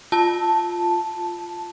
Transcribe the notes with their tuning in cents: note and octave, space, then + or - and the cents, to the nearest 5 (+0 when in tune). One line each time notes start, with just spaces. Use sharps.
F4 +0 A5 +0